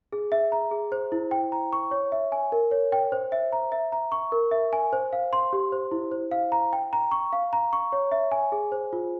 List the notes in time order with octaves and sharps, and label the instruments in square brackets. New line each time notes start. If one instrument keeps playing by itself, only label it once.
[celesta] G#4
E5
A#5
G#4
C5
E4
G5
A#5
C#6
C#5
E5
G#5
A#4
C#5
G5
C5
E5
A#5
E5
A#5
C#6
A#4
E5
G#5
C5
F5
C6
G4
C5
E4
C5
F5
A#5
G5
A#5
C#6
F5
A#5
C#6
C#5
E5
G#5
G#4
C5
F4